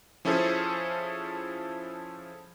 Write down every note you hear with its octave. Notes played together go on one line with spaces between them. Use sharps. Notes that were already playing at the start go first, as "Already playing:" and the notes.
F3 C#4 E4 G#4 A4 C5